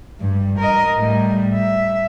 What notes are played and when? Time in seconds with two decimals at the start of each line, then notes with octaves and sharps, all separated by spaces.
0.20 G2
0.59 A#4 D#5
0.96 A2 G3
1.54 E5